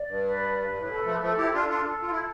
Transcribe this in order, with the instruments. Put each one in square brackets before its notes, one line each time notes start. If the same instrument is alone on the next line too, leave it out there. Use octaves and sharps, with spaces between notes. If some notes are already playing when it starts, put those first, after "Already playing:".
Already playing: [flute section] D5
[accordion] G2
[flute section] B4
B4
[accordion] G2
A2
[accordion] B2 [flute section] A4
[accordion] F3 A3
[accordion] F3 A3 [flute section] A4
[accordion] E4 G4
[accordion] D4 F4 [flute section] A4
[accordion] D4 F4
[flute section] A4
[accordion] F4
E4